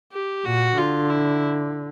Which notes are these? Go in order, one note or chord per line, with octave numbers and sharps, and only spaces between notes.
G4
A#2 F#4
D3 F4
E4